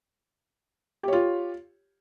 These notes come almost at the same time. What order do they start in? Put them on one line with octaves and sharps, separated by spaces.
G4 C#5 F4